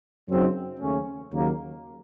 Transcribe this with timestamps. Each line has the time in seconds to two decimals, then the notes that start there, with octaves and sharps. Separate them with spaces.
0.28 F#2 C#3 F#3 C4 D#4
0.79 D#2 C#3 A3 C#4
1.31 D#2 C#3 F#3 A#3